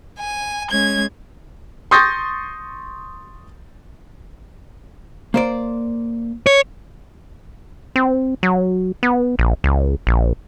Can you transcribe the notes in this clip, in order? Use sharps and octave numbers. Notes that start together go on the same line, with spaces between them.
G#5
G#3 C#4 G#6
C6 C#6 D#6 G6 A6 A#6
A#3 C5 D5
C#5
C4
F#3
B3
A#1
C#2
A#1